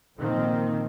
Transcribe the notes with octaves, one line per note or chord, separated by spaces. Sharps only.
A#2 D#3 F3 A#3 C4